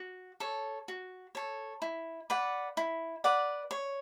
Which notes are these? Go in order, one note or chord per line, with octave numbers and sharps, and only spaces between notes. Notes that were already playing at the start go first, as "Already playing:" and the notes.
Already playing: F#4
A4 C#5
F#4
A4 C#5
E4
B4 D5 F#5
E4
B4 D5 F#5
C#5